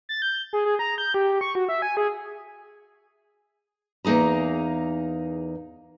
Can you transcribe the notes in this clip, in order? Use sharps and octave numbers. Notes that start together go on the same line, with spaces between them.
A6
G6
G#4
G#4
A#5
G6
G4
C#6
F#4
E5
G#5
G#4
E2 A#3 D#4 G#4 A#5